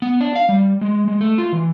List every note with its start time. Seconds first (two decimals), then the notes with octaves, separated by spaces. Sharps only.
0.02 B3
0.21 D4
0.35 F5
0.49 G3
0.81 G#3
1.08 G#3
1.21 A3
1.38 F4
1.53 E3